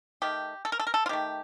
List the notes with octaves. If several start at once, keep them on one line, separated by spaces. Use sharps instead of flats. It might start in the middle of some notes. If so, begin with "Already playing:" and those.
D#3 A3 G4
A4
A#4
A4
A#4
A4
F4
D#3 A3 G4